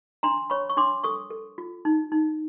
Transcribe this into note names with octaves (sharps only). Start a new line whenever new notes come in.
D4 A#5 C6
C#5 B5 C#6
C#6
D4 C6 D6
A4 C#6 D#6
A4
F4
D#4
D#4